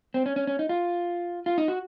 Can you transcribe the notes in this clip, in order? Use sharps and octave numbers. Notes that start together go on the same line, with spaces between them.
C4
C#4
C#4
C#4
D#4
F4
F4
D#4
F#4